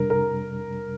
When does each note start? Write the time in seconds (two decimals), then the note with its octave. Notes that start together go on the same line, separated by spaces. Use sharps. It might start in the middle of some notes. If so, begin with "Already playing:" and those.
Already playing: F2 C3 G3 D4 A#4
0.10 A#4